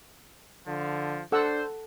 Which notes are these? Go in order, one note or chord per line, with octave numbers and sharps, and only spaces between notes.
D3 F3
D4 A4 C5 F#5 E6